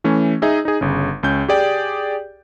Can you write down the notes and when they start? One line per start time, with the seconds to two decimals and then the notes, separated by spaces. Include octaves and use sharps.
0.04 E3 A3 C#4
0.42 D#4 G#4 D#5 E5
0.65 D#4 G#4
0.81 G1 C#3
1.23 C#2 C#4 G6
1.48 G4 G#4 D5 G5